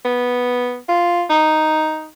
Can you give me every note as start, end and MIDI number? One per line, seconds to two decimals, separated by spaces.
0.05 0.78 59
0.89 1.23 65
1.30 2.09 63